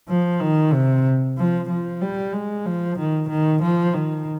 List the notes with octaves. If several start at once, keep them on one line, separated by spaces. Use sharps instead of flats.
F3
D#3
C3
F3
F3
G3
G#3
F3
D#3
D#3
F3
D#3